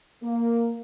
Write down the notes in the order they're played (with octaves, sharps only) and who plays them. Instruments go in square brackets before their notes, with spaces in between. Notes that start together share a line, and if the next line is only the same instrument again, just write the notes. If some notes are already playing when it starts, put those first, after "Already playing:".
[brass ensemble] A#3